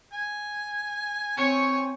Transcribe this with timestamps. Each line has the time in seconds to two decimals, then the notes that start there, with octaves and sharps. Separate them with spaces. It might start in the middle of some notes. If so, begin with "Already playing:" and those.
0.12 G#5
1.38 C4 C#5 G#5 C#6